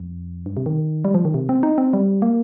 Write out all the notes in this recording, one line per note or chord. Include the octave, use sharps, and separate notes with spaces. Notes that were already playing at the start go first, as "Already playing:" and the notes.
Already playing: F2
G2
C3
D#3
G3
F3
D#3
C3
C4
D#4
C4
G3
A#3